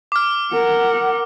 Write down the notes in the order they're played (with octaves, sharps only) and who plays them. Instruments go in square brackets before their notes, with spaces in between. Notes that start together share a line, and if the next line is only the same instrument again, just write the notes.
[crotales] D6 F6
[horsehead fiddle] A#4 F#5